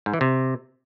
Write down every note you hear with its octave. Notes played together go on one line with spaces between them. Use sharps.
G#2
E3
C3